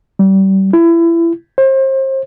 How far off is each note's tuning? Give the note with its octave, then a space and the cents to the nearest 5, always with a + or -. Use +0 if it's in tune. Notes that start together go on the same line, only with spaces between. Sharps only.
G3 -30
E4 +25
C5 +35